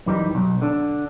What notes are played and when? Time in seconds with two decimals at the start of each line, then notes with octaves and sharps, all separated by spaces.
0.06 F#2 E3 G3 D#4
0.35 B1
0.62 D3 D4